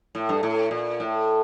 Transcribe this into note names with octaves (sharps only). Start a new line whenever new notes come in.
A2
G2
A2
A#2
A2